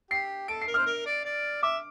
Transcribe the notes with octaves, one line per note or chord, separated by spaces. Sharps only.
G4 C7
A4 D7
C7
A#4
C5 F6
A#4
D5
D5
E5 D6